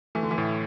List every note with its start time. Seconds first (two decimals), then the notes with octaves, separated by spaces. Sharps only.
0.15 E3 A3
0.23 D3
0.31 E3
0.38 A2